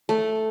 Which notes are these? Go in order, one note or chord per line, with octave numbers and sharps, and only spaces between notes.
A3